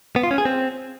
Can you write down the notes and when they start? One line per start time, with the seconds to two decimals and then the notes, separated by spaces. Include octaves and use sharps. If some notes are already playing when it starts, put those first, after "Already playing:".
0.16 B3
0.23 F4
0.31 C#4
0.38 G#4
0.45 C4